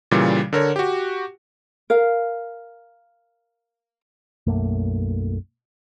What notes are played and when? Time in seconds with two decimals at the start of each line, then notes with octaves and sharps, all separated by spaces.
0.11 A#2 C#3 E3 G3
0.53 D3 A#4 C#5
0.76 F#4 G4
1.90 A#4 F5
4.47 B1 F#2 A3 A#3